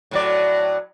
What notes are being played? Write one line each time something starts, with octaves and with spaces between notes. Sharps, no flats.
A2 F#3 D5